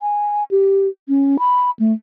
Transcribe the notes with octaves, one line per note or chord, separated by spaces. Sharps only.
G#5
G4
C#4
B5
A3